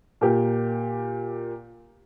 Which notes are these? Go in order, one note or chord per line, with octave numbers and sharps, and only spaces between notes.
A#2 A#3 G4